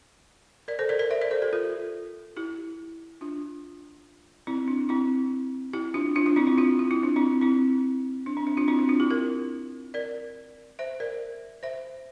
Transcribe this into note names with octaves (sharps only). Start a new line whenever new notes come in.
A#4 D5
A4 C5
A#4 D5
A#4 D5
C5 E5
A#4 D5
A4 C5
G4 A#4
F4 A4
E4 G4
D4 F4
C4 E4
D4
C4 E4
E4 G4
D4 F4
D4 F4
D4 F4
C4 E4
C4 E4
D4 F4
F4
E4
D4
C4 E4
C4 E4
D4
C4
D4
D4 F4
C4 E4
D4
D4 F4
E4 G4
G4 A#4
A#4 D5
C5 E5
A#4 D5
C5 E5